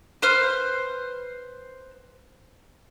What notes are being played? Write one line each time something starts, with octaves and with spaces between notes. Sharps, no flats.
B4 C5 F6